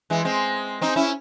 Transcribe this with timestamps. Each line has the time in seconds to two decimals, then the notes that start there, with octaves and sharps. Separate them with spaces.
0.10 E3 G#3
0.25 G#3 C4
0.81 C4 D#4
0.96 C#4 E4